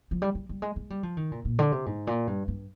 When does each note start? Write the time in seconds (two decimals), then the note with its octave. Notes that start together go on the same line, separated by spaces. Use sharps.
0.11 F3
0.22 G3
0.35 G3
0.49 G3
0.62 G#3
0.76 G#3
0.90 G3
1.03 F3
1.17 D#3
1.32 A#2
1.45 A#2
1.59 D3
1.72 C3
1.86 G#2
2.07 A#2
2.27 G2
2.48 G2